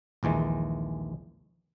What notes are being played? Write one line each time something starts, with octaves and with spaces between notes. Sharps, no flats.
A#1 D#2 E3 G#3